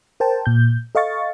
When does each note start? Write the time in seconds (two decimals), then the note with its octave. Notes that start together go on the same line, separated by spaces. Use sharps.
0.20 A#4 C5 G5 A5
0.46 A#2 G6
0.95 A4 D#5 F5 C#6 A6